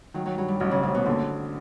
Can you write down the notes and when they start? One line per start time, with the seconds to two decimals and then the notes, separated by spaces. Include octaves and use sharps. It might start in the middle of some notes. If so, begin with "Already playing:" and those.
0.14 D#3 F#3
0.26 F#3
0.38 G2 F#3
0.48 G3
0.60 A1 F#3
0.71 C#3
0.83 A1 C3
0.95 B2
1.06 A#2 D3